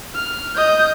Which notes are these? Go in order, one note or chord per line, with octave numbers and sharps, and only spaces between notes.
F6
D#5 G6